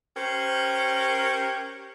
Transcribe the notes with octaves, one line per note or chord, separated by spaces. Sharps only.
C#4 G4 A#4 C5